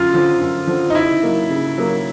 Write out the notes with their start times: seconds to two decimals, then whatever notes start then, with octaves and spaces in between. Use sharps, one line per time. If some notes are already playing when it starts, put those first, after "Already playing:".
Already playing: F#2 D3 F4
0.13 D3 F3
0.40 F#2
0.67 D3 F3
0.90 D#4
0.95 C#3 E4
1.23 F#3 A#3
1.50 C#3
1.78 F#3 A#3